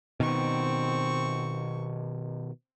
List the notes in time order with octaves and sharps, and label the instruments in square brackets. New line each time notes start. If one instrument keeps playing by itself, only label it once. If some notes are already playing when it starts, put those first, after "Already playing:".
[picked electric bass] B2 D#3 [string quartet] C4 C#6